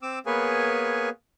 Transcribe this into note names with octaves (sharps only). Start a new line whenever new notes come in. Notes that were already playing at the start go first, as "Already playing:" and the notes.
C4 D6 E6
A#3 B3 G#4 B4 C#5 G#5